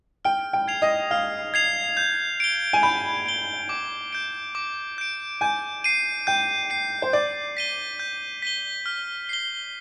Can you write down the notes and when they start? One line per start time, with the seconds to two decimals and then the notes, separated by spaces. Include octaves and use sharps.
0.25 G5 F6
0.53 G5
0.68 G#6 C7 F7
0.82 D#5
1.11 F5 F6
1.54 G#6 C7 F7
1.97 G6
2.40 D7 G7
2.73 G#5
2.83 B5 G6
3.26 D7 G7
3.69 D6
4.12 G6 D7
4.55 D6
4.98 G6 D7
5.41 G#5 G6
5.84 C7 D#7
6.27 G5 G6
6.70 C7 D#7
7.02 C5
7.13 D5 G6
7.57 B6 D#7 G7
8.00 G6
8.42 B6 D#7 G7
8.86 F6
9.29 C7 G7